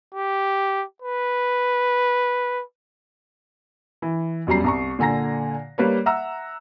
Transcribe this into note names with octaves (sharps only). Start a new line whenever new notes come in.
G4
B4
E3
E1 F#2 G3 A#5 C7
C2 A#5 C#6
A#2 D3 G#5 A#5 A#6
G3 A#3 B4 C#5
E5 F#5 A#5 E6